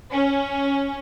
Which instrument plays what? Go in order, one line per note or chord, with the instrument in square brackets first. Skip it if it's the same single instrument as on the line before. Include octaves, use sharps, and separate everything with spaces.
[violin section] C#4